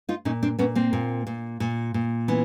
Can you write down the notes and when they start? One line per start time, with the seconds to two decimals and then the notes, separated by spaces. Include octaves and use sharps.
0.09 D#4 F4
0.25 A#2 C#4 D#4
0.43 C4 D4
0.59 A#2 B3 C#4
0.75 A#3 C4
0.93 A#2
1.27 A#2
1.60 A#2
1.94 A#2
2.28 E3 B3 C#4